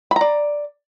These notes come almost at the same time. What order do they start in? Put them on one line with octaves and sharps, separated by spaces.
B5 A#5 D5